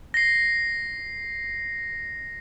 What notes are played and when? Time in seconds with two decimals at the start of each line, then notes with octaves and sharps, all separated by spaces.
0.14 A#6 C7